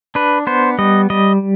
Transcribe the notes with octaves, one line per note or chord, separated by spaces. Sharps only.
D4 B4
B3 C5
G3 D#5
G3 D#5